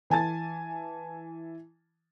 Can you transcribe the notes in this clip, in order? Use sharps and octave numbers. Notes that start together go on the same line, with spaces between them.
E3 G#5 A5 A6